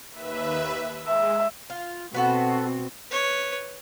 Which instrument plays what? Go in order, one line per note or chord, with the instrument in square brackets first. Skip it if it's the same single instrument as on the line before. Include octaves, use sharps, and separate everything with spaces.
[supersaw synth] D#2 B4 E5
[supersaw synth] G#3 [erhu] E5
[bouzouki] F4
[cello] B2 C4 [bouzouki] B3 F#4 A4
[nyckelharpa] B4 C#5